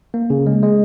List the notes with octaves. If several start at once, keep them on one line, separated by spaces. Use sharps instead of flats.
A#3
C#3
G#3
G#3